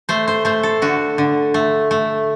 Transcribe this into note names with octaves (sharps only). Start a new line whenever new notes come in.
A3 C5
C5
A3 C5
A4
D3 F#4
D3
A3
A3